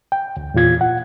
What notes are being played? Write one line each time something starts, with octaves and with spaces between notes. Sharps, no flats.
G5
D2
E2 A#2 F4 G#6
F#5